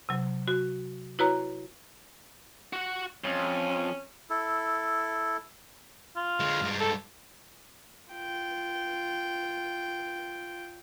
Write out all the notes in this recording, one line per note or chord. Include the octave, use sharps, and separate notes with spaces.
C3 F#3
F#4
E4 F#4 B4 C#5 A#5
F#4 F#5
F2 C#4
E4 A4
F4
D3 G#3
G2 G#3
A4
F4 G5